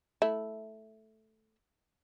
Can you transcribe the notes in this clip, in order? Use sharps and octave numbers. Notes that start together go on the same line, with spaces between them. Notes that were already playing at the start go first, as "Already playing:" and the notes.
A3 E4